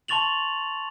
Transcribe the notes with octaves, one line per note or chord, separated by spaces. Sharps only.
A5 C6 C#6 A6 F7 F#7